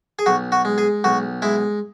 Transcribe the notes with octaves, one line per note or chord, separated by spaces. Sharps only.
G#4
B1 F#4
F#4
G#3
G#4
B1 F#4
G#3 E4